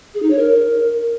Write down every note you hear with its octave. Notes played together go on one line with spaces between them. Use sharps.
G#4
D#4
C#5
A#4